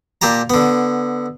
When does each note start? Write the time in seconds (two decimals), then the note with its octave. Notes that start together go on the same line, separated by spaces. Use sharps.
0.21 A#2 G4 A5 A#5
0.50 D3 B3